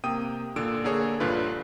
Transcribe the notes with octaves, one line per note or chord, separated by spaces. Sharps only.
C3 A#3 G5 D#6 D#7
A#2 D3 E6 D7
D3 A#3 G#4 C#5
A#1 G2 D3 F4 B4